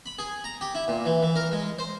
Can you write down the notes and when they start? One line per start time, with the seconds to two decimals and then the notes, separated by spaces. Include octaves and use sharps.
0.06 B5
0.19 G#4
0.44 A#5
0.61 G4
0.75 E4
0.88 A#2
1.05 E3
1.23 E3
1.36 A#4
1.52 G#3
1.79 C5